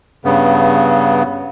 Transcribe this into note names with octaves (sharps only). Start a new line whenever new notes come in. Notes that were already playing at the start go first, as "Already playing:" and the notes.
G2 C#3 B3